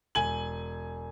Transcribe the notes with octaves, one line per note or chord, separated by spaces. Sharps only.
E1 G#5 F#7